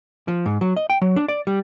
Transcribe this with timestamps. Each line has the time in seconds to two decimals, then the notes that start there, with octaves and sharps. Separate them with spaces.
0.28 F3
0.46 G#2
0.61 F#3
0.76 D#5
0.90 G5
1.02 F#3
1.16 D4
1.28 D5
1.47 G3